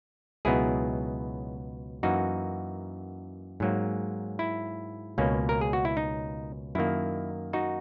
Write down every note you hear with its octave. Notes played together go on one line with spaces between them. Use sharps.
C#2 B2 F#3 B3 D#4 E4 G#4
F#2 E3 A#3 D#4 F#4
G#2 F#3 A#3
E4
C#2 B2 A#3 C#4
A#4
G#4
F#4
E4
D#4
F#2 D#3 A#3 E4
D#4 F#4